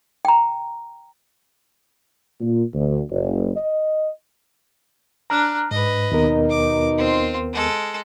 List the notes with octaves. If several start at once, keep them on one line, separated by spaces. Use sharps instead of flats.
G5 A#5
A#2
D2
F#1
D#5
D4 A#5 F6 F#6
G#2 B4 D#5
D#2 B2 B3 D#4 A#4
D6
C4 F4
G#3 A4